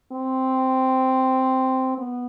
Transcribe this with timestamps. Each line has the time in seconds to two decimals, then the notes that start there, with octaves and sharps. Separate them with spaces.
0.12 C4
1.98 B3